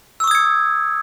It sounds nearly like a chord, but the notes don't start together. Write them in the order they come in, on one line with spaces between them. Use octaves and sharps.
E6 C#6 D#6 G#6 C#7